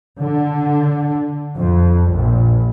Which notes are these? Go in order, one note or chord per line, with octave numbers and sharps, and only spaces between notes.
D3
F2
A#1